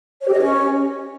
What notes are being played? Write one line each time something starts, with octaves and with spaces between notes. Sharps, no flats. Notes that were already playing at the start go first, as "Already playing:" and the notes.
C#5
G4
D#5
C#5
C#4